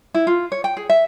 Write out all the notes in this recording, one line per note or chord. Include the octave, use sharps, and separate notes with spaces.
E4
F4
C#5
G5
G#4
E5